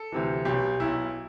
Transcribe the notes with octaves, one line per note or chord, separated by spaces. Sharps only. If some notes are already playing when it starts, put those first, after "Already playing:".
Already playing: A4
D2 C3 E3
B1 B2 G4
B1 B2 E4